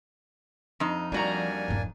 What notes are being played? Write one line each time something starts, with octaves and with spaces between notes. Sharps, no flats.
F2 D#4
F3 G3 A#3 D4 F#4 G#5 A#5
D#1 G2